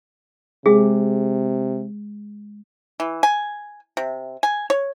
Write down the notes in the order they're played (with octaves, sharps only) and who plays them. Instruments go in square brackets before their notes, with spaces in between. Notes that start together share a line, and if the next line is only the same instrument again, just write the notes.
[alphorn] C3 [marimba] G#3 [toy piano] G#4
[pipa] E3
G#5
C3
G#5
C#5